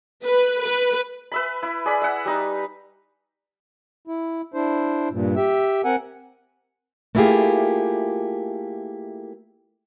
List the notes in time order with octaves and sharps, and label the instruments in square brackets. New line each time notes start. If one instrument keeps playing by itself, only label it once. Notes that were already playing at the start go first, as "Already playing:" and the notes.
[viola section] B4
B4
[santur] B4 E5 B5
E4
G#4 D5 B5
E5 F#5
G3 D#4
[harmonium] E4
D4 E4 C5
G2 A#2
G4 E5
C4 A#4 F#5 G#5
[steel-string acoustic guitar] A3 A#3 E4 F4 G4 G#4